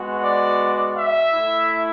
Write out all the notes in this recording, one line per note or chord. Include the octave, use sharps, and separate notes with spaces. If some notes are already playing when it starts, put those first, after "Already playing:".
Already playing: G#3 B3 F#4
D5
E5
A3 E4